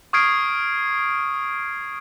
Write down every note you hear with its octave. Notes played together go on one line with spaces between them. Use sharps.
C#6 D#6 F6 G#6 C7 D7